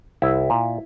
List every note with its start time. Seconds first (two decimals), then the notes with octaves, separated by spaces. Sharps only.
0.22 C2 E4
0.50 A#2